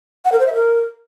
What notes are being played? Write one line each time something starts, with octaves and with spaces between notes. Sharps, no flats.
F#5
A#4
C5
E5
A#4